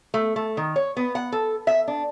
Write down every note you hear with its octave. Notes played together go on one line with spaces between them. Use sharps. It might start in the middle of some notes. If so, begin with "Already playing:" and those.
A3
A3
D#3
C#5
B3
F#5
A4
E5
D4